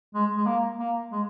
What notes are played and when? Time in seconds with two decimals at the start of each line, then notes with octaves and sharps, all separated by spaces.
0.14 G#3
0.37 G#3
0.46 A#3
0.80 A#3
1.11 G#3